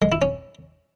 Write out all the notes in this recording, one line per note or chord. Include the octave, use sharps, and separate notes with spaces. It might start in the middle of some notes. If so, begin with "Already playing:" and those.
G#3
E4
C#4